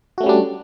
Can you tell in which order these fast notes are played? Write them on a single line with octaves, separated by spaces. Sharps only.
F#4 A3 C#4 G3 D4